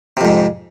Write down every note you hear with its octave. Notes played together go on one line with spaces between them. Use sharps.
F2 G#2 C3